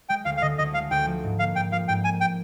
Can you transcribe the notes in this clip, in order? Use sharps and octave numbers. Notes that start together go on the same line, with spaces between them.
G#3 G5
D2 F5
F5
D3 D#5
D2 D#5
G#3 F5
D2 G5
F3
G#2
A#3 F5
G#2 G5
F3 F5
G#2 G5
A#3 G#5
G5